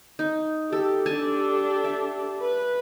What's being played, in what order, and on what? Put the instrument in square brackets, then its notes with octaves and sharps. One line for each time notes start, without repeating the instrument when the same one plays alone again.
[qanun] D#4
[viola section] G4 [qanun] A4
[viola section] D4 G4 A4 [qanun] G#5 A5
[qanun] E5
[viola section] B4